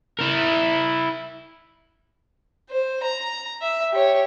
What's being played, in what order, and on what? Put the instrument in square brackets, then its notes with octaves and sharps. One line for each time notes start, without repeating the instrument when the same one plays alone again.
[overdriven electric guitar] E4 A#4
[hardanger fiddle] C5
A#5
E5
G4 C#5